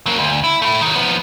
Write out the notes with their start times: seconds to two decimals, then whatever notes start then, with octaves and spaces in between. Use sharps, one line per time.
0.06 F#3 A#3
0.19 D2
0.44 E4
0.62 A3 E4
0.81 D#3 F#3
0.96 F3 B3